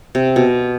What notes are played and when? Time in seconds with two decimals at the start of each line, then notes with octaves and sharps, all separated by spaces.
0.15 C3
0.36 B2